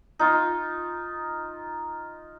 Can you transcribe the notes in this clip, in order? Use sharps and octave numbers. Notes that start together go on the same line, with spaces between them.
D#4 F4